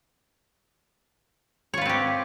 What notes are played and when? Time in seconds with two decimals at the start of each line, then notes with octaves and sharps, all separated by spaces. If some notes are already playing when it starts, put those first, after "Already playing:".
1.74 C#5
1.78 F4
1.82 B4
1.85 C4
1.89 G4